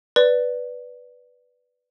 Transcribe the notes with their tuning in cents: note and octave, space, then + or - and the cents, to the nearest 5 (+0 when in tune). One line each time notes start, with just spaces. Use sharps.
B4 +0 D5 +0